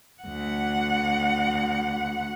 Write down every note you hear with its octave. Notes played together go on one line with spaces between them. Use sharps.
D2 F#5